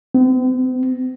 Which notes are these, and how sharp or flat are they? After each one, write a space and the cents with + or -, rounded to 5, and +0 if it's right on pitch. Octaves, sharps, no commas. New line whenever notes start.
C4 -45